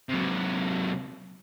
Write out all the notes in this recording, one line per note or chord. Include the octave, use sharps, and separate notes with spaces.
C3 F#3